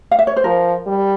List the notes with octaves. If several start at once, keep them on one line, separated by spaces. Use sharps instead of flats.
F5
E5
C#5
C5
F3 A#4
G3